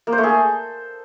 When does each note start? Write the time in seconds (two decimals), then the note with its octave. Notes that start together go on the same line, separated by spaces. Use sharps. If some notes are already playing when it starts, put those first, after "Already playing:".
0.07 A#3
0.12 C5
0.18 A3
0.23 G#4
0.29 A4